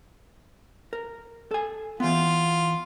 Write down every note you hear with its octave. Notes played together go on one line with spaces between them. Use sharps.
A#4
A4 G#5
E3 B3 F4